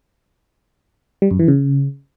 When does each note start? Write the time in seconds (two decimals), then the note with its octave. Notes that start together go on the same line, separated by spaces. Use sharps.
1.22 G3
1.31 F#2
1.39 E3
1.48 C#3